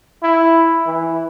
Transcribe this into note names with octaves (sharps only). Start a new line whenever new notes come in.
E4
E3